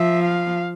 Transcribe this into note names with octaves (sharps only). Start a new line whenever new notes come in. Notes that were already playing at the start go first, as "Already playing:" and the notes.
Already playing: F3 E5
F5